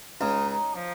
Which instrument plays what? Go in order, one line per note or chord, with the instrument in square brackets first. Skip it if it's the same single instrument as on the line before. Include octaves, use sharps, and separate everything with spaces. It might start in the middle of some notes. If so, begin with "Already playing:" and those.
[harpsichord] C#2 C#3 [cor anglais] D#4
[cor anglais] D#4
F3